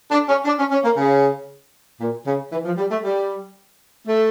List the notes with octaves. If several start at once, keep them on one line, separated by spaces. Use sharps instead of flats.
D4
C#4
D4
C#4
C#4
A#3
C#3
A#2
C#3
E3
F3
G3
A3
G3
A3